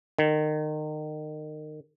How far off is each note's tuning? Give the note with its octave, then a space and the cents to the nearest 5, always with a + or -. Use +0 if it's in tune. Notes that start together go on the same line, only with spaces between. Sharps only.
D#3 -30